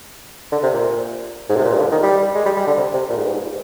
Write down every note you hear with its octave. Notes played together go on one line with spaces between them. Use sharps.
D3
C3
A#2
G#2
C3
A#2
G2
D3
D#3
G3
G#3
G3
G3
D3
C3
C3
A#2
G#2
G2
G#2